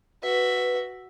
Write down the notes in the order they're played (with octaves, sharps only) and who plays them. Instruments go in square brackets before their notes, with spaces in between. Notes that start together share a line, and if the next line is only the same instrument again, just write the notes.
[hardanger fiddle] F#4 E5 [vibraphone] B4